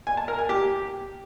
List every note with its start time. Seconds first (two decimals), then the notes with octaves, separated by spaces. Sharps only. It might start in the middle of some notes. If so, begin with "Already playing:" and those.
0.07 G#5
0.17 A5
0.28 A#4
0.39 G#5
0.49 G4